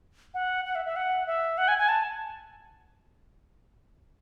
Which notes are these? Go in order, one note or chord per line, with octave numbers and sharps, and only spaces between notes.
F#5
F#5
E5
E5
F#5
E5
F#5
G#5
G#5
A5